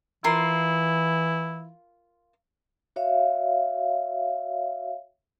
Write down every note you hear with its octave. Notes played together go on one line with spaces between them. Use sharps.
E3 E4 F4 A#4 C6
F#4 C#5 E5 F5